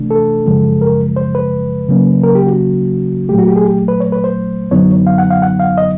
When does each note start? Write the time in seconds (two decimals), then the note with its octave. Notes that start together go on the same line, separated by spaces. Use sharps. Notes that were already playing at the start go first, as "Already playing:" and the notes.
Already playing: C3 E3 A3 D4
0.11 A4
0.46 F#2 C#3 F3 G#3
0.81 A#4
1.16 C5
1.35 B4
1.88 C#3 F#3 A#3 C#4
2.23 A#4
2.35 G4
2.47 F#4
3.29 A#2 F#3 A3 G4
3.39 F#4
3.47 G4
3.56 G#4
3.65 G4
3.88 B4
4.00 C#5
4.12 B4
4.24 C5
4.71 F#2 D3 F#3 B3 D#4 C#5
5.07 F5
5.18 F#5
5.30 F5
5.42 F#5
5.60 F5
5.78 D#5